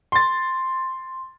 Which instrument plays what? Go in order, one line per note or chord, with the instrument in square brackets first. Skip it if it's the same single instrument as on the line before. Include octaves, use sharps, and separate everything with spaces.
[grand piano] C6 A6